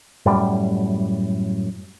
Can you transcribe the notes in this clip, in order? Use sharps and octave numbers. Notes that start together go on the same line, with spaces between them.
F#2 A2 G3